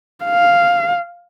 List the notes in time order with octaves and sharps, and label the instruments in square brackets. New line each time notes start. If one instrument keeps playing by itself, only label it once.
[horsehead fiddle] F5